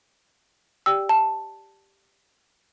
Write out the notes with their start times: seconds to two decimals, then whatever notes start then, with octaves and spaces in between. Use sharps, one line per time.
0.86 G4 D5 G5 E6
1.09 A5